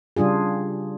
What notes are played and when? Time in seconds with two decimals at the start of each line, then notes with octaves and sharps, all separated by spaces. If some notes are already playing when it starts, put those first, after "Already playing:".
0.17 C#3 G3 D4 F4 G#4